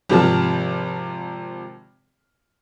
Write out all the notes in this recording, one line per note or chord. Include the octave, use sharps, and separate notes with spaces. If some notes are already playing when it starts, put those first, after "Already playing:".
G#1 C3 F3 A5 F6